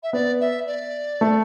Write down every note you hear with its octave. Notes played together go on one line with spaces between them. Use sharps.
E5
B3 D5
E5
D5
A3